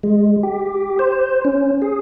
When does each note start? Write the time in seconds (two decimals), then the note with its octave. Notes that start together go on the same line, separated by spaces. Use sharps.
0.03 G#3
0.43 G4
0.99 C5
1.45 C#4
1.82 G#4